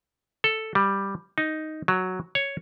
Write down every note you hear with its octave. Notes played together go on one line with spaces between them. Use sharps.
A4
G3
D#4
F#3
C#5